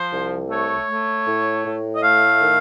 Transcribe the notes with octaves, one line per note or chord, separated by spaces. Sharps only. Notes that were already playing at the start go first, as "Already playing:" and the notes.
Already playing: F3 C5
C2
A3 C#5
A3
A2
A2
D#5
A3 F5
D#3